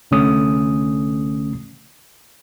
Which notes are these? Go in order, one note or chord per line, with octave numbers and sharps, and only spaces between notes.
C2 D3 A3 C#4 D#6